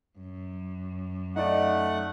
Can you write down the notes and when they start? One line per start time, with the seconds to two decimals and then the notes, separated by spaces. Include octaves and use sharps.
0.19 F#2
1.36 A3 D#4 D5 F#5